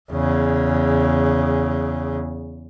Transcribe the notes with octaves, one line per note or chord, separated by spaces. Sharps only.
E2 C#3